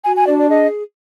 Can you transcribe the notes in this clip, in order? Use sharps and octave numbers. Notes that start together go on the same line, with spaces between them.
F#4 G#5
G#5
D4 D5
D5
G#4 D#5